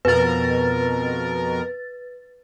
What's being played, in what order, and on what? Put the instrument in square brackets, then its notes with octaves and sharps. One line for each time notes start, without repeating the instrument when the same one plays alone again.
[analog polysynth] F2 B2 A#4 [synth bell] B4 A6